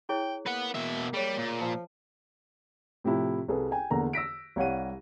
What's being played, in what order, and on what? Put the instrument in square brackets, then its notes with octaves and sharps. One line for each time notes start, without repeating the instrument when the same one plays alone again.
[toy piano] E4 G#4 C#5 [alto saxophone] G5
[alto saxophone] A#3 [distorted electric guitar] B4 F#5
[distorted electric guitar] B2 E5
[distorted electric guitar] G3 [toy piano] G#4 C#5
[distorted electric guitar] A#2
[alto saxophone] F3 [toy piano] A5
[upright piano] A2 C3 F3 E4
C2 G#4 A4 B4
G5 G#5
E2 D3 A#3 A#5
E6 A#6 B6 D7
C2 G3 C#5 F5 F#5 D#7